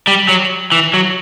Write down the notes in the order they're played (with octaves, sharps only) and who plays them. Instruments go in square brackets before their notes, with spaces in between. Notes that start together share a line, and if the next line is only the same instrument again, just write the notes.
[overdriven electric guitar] G3
F#3
E3
F#3